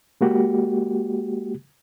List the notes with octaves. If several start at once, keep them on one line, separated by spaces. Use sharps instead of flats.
G#3 A#3 F#4 G4